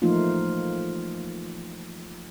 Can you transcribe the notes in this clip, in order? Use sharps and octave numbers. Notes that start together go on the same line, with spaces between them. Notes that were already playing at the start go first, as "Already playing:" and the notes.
E3 F3 A3 A#3 D#4 F4